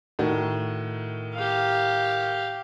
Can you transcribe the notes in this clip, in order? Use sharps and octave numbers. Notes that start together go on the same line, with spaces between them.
A2 D#3 F#4
G4 F5